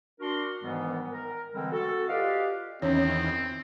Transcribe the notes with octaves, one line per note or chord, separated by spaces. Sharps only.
D4 F#4 A#4 C6
G#2 D#3 E3 G3 G#3 B3
A#4
D3 E3 G3 G#3 C4
F#4 A4
F4 G4 B4 D5 D#5 F5
E2 D#3 C4 C#4 C#5